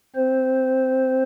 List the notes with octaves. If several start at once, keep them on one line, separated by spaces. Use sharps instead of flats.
C4 C5